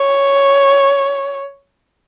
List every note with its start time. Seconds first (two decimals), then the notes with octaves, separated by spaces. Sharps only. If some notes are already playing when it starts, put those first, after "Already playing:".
Already playing: C#5